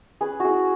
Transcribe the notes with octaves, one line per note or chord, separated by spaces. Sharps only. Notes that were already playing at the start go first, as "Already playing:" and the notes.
C#4 G#4 B4
E4 F#4 G#4